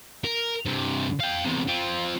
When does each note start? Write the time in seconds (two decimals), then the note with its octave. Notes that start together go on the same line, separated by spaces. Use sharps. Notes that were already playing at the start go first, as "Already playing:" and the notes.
0.24 A#4
0.66 G2 C3
1.20 F5 G5
1.44 E2 C3
1.68 C4 F4